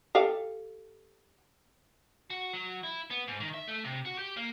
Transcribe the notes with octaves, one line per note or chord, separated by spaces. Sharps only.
G4 A4 F5
F#4
F#3
E4
B3
G#2
D#3
E5
A3
C3
F#4
G4
A#3